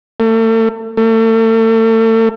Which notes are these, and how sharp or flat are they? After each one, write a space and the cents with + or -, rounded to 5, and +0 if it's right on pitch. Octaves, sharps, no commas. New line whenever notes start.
A3 +40
A3 +40